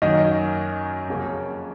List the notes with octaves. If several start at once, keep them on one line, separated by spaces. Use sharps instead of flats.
F#2 D#3 F#3 A#3 C#4 D#4 D#5
F2 C#3 F#3 A#3 C#4